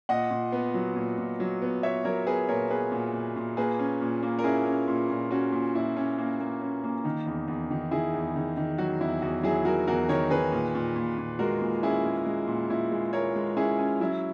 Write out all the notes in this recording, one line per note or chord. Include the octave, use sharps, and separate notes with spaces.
A#2 D#5 F#5
A#2
B3
F#3
A#2
A#2
F#3
B3
B3 C#5 E5
F#3 A#4 C#5
B3 G#4 B4
A#2 A#4 C#5
B3 G#4 B4
A#2
A#2
A#2
A#3 G#4 B4
C#4
A#2
A#3
A#4
C#4 E4 G#4
C#4
A#2
A#2
C#4 F#4
A#2
A#2 E4
C#4
A#3
A#3
C#4
A#3
D#3
E2
E2
D#3
D#3 E4 G#4
E2
D#3
D#3
F#3 F#4
E2 E4
E2 F#4
F#3 E4 G#4
F#3 F#4 A#4
E2 F#4 A#4
D#3 A#4 C#5
D#3 G#4 B4
A#2
A#2
A#2
A#2
G#3 F#4 A#4
A#2
C#4 E4 G#4
G#3
G#3
A#2
A#2 E4
G#3
G#3 A#4 C#5
G#3
C#4 E4 G#4
C#4
F#3 E4